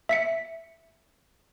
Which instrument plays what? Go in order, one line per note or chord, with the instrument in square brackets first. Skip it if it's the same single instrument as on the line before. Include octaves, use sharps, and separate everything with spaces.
[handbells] E5 B6 C#7